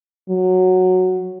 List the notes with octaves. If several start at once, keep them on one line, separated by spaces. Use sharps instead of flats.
F#3